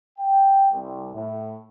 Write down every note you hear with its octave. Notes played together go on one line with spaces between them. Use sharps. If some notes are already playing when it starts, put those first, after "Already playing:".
G5
C2
A2